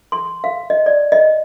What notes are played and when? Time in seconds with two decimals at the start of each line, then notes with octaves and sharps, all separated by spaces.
0.12 C6
0.44 F5
0.70 D#5
0.86 D5
1.12 D#5